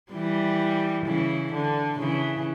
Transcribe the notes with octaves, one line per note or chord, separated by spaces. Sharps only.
E3 G3
C#3 E3
D3
C#3 E3